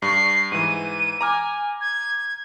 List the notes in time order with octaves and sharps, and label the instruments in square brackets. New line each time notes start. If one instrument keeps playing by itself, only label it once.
[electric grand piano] G2 C#6 [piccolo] C7
[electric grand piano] G#2 E3 [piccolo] D#7
[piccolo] G#5 [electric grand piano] A#5 D6 F6
[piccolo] G#6